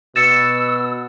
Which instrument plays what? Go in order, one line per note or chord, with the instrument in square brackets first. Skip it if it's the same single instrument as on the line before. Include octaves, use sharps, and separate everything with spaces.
[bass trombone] B2 [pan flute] E6 [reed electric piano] A6 [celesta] C#7 E7